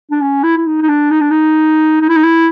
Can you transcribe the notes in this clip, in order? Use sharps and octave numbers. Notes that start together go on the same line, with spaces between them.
D4
C#4
E4
E4
D#4
D#4
D4
D#4
D4
D#4
D#4
E4
D#4
E4